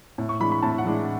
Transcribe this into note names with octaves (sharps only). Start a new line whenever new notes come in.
A2
C#6
E3 G#3 D4 B5
B5
A2 A5
F#5
E3 G#3 D4